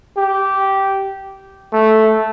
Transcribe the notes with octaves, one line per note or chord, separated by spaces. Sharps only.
G4
A3